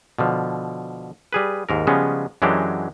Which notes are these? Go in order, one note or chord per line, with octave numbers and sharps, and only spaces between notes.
B2 D3 F3
G3 G#4 B4
D#2 G#2 A#4
C#3 F3 G3 G#3 B3 C#4
F#2 E3 F#3 G#3 D4 G4